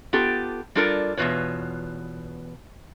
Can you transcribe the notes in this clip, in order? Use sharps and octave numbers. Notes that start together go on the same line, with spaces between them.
B3 F4 G4 A4
G3 D4 F4 A4 A#4 D5
E2 B2 G3 F4 B4 C#5